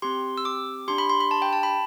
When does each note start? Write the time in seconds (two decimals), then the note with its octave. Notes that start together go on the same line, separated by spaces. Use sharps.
0.02 C4 G4 C6
0.38 E6
0.45 D6
0.88 D4 G4 C6
0.98 B5
1.09 C6
1.20 B5
1.31 A5
1.42 G5
1.53 A5
1.63 B5